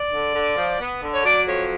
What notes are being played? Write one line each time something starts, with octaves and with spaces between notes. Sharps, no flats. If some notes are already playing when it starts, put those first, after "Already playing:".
Already playing: D5
D3
D3
F3
B3
D3
C#5
F#3 D5
F2 C#5